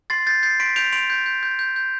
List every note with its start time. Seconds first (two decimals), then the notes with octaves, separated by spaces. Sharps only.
0.10 C6 A6 C7
0.27 G6 A6 C7
0.43 G6 A6 C7
0.60 C6 B6 D7
0.76 G6 D7 F7
0.92 C6 D7 F7
1.10 G6
1.26 G6
1.43 G6
1.59 G6
1.76 G6